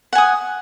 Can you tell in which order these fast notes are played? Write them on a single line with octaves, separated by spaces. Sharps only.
F#5 G#5 D#6